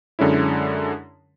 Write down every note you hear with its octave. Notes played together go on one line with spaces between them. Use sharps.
F#2 D3 G#3 C#4 E4